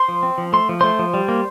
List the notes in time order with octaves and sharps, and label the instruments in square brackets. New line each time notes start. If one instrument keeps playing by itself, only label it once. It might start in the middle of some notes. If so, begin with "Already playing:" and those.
Already playing: [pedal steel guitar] C5 C6
F3
C4
F3
A3 C6
F3
A3 C5 C6
F3
G3
A#3